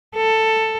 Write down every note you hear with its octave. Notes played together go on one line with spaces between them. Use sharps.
A4